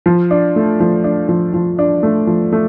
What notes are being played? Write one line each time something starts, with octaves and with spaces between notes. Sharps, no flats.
F3
D4
A3
F3
D4
F3
F3
D4
A3
F3
A3